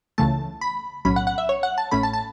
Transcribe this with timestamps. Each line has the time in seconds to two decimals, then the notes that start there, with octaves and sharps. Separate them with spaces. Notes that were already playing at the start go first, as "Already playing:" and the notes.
0.18 C#2 C#3 E3 A3 A5
0.61 B5
1.05 B1 A2 F#3 C#4 B5
1.16 F#5
1.27 F#5
1.38 E5
1.49 C#5
1.63 F#5
1.78 A5
1.91 A1 A2 A3 C#4 B5
2.03 A5
2.13 A5